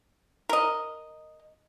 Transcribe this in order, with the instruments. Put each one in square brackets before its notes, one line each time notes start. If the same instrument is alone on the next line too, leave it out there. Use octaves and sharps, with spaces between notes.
[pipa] A#4 D#5